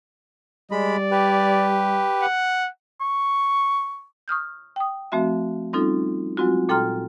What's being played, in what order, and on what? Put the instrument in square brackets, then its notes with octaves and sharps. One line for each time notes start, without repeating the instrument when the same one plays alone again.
[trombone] G3 [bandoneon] G#3 B5 [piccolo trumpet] D5
[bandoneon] G4 B4
[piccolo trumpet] F#5
[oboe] C#6
[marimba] C#6 D#6 F6 G6
G5 D#6
F3 A3 C4 F#4 E5
G3 C4 C#4 D#4 F4 A4
F#3 G#3 C4 F4 F#4
A#2 A4 G5 A#5 C6 F6